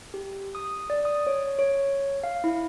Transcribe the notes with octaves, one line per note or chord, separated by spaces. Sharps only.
G4
D#6
D5
D#6
C#5
C#5
F5
E4